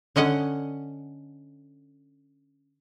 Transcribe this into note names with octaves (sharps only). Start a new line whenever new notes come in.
D3 C#4 D#5 F#5